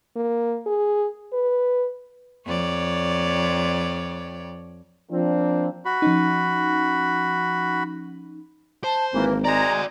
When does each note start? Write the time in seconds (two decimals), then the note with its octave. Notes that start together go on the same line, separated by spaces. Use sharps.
0.16 A#3
0.67 G#4
1.33 B4
2.46 F2 C#5 D5
5.11 F3 A#3 C4 D4
5.85 F#4 B5
6.02 F3 C#4 D#4
8.84 C5 A5
9.13 G#1 E3 A#3
9.45 G#3 F#4 D5 A#5